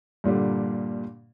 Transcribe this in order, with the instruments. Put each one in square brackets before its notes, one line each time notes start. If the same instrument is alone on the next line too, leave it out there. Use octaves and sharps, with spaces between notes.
[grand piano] G2 A#2 D3 G3